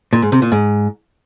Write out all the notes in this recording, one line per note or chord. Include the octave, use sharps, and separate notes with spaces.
A#2
G#2
C3
A#2
G#2